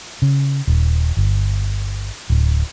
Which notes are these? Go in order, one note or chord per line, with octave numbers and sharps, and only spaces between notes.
C#3
D#1
G1
D1